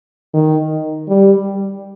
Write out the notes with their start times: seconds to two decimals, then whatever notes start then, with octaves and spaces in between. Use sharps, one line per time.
0.34 D#3
1.08 G3